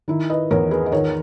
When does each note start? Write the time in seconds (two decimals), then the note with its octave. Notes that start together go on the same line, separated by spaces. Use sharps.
0.08 D#3 E4
0.30 B4 D#5
0.51 E2 A#4 C#5
0.71 G#4 B4
0.86 D#5
0.92 D#3 A#4 C#5